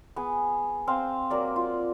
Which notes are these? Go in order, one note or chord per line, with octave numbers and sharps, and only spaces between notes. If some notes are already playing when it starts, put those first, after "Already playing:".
B3 G#4
C4 C5 F5
F#3 A#3 D5
F4